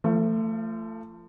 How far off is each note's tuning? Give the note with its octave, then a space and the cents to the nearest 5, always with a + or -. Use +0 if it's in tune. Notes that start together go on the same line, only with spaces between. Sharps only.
F3 -30 A3 +20